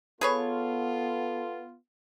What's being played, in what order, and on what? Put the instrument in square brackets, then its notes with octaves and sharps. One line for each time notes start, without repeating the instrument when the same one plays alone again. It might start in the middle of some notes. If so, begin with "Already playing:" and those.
[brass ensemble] B3 F4 [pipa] G#4 B4 C#5 [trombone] A4